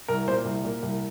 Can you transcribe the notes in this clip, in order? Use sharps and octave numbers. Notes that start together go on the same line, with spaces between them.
C2 A#4
A#2 A#3 C5
C2
A#2 A#3
C2